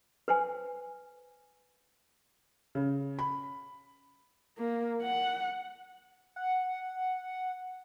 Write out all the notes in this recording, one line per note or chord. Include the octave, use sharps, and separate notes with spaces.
B4 C5 G#5
C#3
B5
A#3
F#5
F#5